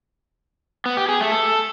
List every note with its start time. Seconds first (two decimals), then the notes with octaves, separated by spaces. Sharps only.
0.86 B3
0.97 G4
1.09 G#4
1.20 A3
1.32 A4